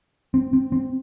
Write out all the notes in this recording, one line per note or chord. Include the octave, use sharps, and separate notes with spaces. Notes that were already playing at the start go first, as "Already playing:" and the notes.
C4
C4
C4